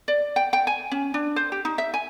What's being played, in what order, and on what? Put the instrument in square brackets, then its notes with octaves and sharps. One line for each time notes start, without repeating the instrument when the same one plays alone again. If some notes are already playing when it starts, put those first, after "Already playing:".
[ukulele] D5
G5
G5
G#5
C#4
D4
C5
G4
D#4
E5
G#5